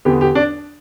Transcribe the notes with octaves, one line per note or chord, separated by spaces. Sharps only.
E2 D3 B3 G4
G4
D4